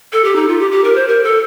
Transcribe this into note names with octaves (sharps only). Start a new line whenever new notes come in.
A4
G4
D#4
F4
G4
G4
A#4
C5
A#4
A4